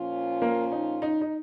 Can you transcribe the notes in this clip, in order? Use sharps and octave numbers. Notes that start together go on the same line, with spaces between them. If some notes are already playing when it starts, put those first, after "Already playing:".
Already playing: A#2 F3 C#4 F4
A#3
D#4
D#4
D#4